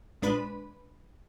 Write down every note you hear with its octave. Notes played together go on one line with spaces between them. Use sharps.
A#1 G#3 D4 B4 B5